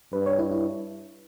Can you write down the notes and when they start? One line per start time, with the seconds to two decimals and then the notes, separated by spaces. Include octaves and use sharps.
0.12 G2 B4
0.26 C#5
0.39 E4
0.51 E4